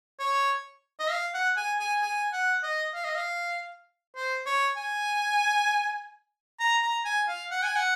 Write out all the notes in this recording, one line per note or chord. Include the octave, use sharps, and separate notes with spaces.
C#5
D#5
F5
F#5
G#5
G#5
G#5
F#5
D#5
F5
D#5
F5
C5
C#5
G#5
A#5
A#5
G#5
F5
F#5
G#5
F#5